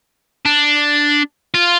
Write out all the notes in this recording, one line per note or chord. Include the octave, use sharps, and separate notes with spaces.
D4
F4